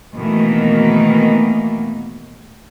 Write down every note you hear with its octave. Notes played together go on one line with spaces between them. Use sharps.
B2 D#3 E3 A3 A#3